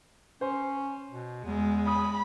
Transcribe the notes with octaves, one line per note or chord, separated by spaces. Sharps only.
C#4 C5
B2
E2 G#3
B5 D#6